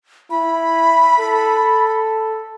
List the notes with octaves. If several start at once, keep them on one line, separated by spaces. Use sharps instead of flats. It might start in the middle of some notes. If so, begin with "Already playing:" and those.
E4 B5
A4